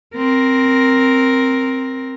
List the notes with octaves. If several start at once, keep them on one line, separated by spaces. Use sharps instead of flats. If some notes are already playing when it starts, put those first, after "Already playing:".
C4 A#4